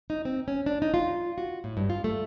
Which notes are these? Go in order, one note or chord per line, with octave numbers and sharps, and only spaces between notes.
D#4
C4
C#4
D4
D#4
F4
F#4
A2
G2
F4
A3